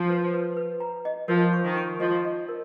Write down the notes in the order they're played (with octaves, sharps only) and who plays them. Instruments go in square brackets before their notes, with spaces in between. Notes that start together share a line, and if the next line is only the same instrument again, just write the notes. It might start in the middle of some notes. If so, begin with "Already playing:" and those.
Already playing: [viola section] F3
[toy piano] B4
B4
B4
A#5
D#5
[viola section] F3 [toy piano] A#4
[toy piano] C#6
[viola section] D#3
[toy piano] C#6
[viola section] F3 [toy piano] D#5
[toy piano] D#5
A#4